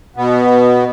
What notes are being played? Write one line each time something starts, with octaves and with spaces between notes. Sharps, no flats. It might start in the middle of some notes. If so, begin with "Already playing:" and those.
B2 B3